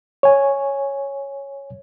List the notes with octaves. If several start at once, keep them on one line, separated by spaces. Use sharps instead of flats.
C#5 G#5